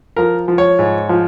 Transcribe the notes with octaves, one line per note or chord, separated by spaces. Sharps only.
F3 A#4
F3
C#5
G#2
F3